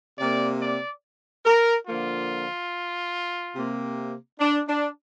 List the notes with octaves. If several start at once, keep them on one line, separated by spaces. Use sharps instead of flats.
C3 A#3 D5
D5
A#4
D3 F3 A#3 F4
C3 A#3
D4
D4